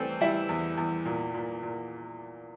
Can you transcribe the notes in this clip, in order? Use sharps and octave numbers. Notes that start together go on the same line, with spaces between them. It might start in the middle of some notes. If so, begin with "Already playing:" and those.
Already playing: E2 E3 G3 A3 C4 A4 C5
G3 E4 E5
E2
E2
A#2
A#2
A#2